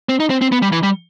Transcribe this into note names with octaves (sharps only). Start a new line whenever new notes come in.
C4
D#4
C4
C4
B3
G3
E3
G3